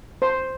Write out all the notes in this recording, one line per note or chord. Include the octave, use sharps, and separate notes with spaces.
C5